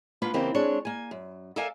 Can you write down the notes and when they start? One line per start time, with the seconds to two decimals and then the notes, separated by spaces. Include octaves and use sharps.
0.22 A#3 B3 D4 F4 B4
0.34 C#3 E3 A#3 C4 D#4 G4
0.54 G#3 C4 D4 C#5
0.85 A#3 G#5
1.11 F#2
1.56 A4 A#4 D5 E5 F5 G#5